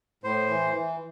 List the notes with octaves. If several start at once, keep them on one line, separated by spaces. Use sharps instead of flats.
A2 C5
E3
E3